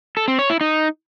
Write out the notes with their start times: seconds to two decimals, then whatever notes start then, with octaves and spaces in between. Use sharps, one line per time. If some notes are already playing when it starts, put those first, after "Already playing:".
0.17 A4
0.28 C4
0.39 C#5
0.50 E4
0.61 D#4